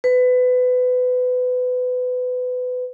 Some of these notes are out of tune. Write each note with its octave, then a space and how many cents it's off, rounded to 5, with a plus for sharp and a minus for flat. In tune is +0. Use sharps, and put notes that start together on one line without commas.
B4 +25